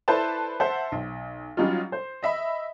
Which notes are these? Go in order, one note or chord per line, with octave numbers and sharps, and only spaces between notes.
E4 A4 B4 C5 D5 A5
C5 E5 F#5 A5
B1
F#3 G3 C#4 D#4 F4
C5
D#5 E5 B5